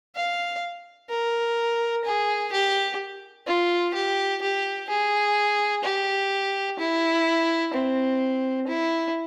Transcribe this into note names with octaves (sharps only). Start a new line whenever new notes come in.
F5
A#4
G#4
G4
F4
G4
G4
G#4
G4
E4
C4
E4